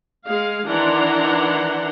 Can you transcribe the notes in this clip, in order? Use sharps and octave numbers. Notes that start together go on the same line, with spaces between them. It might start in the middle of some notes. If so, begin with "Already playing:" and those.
G#3 G#4 F5
D#3 E3 D4 F#5 A#5 C6